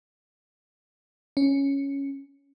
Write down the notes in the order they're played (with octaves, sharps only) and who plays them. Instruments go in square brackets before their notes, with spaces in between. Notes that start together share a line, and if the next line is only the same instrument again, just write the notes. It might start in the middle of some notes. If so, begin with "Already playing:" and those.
[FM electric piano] C#4